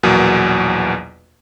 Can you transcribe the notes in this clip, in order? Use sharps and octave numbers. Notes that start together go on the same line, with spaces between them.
A#1 E2 B2 F#3 A#3